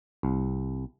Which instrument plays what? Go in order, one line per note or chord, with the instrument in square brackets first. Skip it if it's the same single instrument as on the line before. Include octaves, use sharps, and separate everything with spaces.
[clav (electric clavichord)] C2